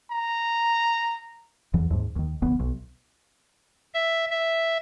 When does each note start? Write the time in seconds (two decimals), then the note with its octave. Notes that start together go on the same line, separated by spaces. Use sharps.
0.11 A#5
1.74 E2 E3 F#3
1.91 D#2 G#2
2.16 D#2 D#3
2.42 F1 D2 B3
2.60 B1
3.94 E5
4.31 E5